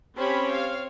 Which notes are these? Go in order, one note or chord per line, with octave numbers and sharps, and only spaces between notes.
C4 C#4 G4 C#5 B5
F5